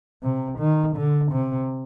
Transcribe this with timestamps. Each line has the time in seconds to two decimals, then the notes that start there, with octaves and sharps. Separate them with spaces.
0.23 C3
0.59 D#3
0.96 D3
1.31 C3